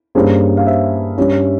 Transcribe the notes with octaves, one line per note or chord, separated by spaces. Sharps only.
G2 G3 A#3 C#4 G#4 C5
F5
C5 E5
G2 G3 C#4